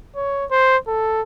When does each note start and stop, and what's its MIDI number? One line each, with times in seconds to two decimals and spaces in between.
0.16 0.45 73
0.51 0.77 72
0.87 1.22 69